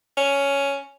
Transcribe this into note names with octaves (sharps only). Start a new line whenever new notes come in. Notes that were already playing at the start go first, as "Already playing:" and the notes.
C#4